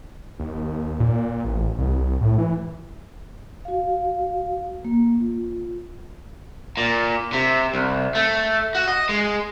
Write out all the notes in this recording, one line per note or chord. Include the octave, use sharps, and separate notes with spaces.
D#2
A#2
A1
C2
A2
E3
F#4 F5
A#3
F4
A#2
C3
C2
A3
F#4
D#5
G#3